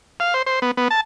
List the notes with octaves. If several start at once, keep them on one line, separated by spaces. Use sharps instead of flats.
F5
C5
C5
B3
B3
A5